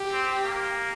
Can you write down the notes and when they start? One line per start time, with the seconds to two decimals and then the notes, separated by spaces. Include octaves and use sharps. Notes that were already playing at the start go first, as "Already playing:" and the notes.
Already playing: G4
0.12 C4
0.44 A#3